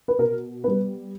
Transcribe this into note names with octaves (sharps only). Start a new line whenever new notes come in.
B4
B2 A#4
G3 B3 B4